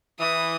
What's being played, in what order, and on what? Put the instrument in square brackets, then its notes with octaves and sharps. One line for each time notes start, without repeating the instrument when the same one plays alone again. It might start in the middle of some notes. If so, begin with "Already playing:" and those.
[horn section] E3 [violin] D#6